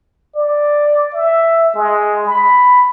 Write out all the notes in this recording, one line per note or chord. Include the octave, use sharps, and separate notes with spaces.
D5
E5
G#3
B5